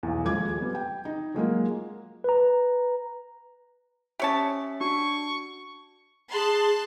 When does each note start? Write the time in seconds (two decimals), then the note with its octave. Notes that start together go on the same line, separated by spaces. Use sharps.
0.03 B1 E2
0.25 D#1 F3 G#3 D6 G#6
0.58 G3 B3
0.75 G5
1.05 D#4
1.34 F#3 G#3 A#3 F4
2.24 B4 A#5
4.20 C#4 G4 C#5 E5 A5
4.81 D4 F#4 C#6
6.33 G#4 A5 C6 F#6